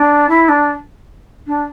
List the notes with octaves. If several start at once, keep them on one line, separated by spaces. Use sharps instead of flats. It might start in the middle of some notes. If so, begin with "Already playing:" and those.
Already playing: D4
E4
D4
D4